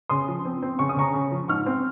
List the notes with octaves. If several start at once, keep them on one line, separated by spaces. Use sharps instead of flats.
C#3 C6 D#6
F3
C4
C4
C#3 C#6
D#6
C#3 A#5 C#6
C#3
F3
G#2 C#6 F6
C4